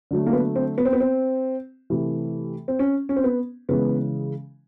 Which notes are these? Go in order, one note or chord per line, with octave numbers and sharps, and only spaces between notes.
D3 F#3 A3
A#3
B3
C4
B3
C4
B3
C4
C3 E3 A3
C4
C#4
C#4
C4
B3
C#3 E3 G#3 B3